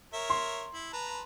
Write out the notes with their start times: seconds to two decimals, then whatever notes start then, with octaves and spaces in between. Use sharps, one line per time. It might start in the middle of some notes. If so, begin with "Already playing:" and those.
0.14 A#4 C#5 E5
0.30 C6
0.74 E4
0.93 B4 A5 A#5